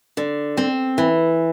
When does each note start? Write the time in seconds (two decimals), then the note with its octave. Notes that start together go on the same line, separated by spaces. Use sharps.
0.17 D3
0.57 C4
0.98 E3